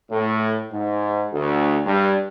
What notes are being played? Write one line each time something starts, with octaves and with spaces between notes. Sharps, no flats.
A2
G#2
D2
G2